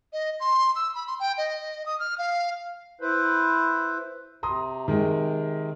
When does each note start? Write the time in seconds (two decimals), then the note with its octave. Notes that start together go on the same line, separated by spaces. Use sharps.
0.13 D#5
0.40 C6
0.76 E6
0.95 B5
1.07 C6
1.20 G5
1.38 D#5
1.86 D#6
2.00 F6
2.18 F5
3.01 E4 B4 C5
4.43 C3 A#5 C6 D#6
4.88 D#3 G#3